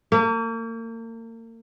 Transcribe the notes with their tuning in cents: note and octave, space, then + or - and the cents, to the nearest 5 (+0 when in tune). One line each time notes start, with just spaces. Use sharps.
A#3 -40